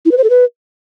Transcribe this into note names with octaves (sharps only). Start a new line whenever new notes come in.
E4
B4
C5
A4
B4